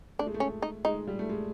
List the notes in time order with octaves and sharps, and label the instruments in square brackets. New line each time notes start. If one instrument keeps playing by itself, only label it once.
[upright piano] A3 [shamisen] D4
[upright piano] G#3
A3
[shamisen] C#4
D#4
[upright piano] G#3 [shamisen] D#4
[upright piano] G3
A3
G#3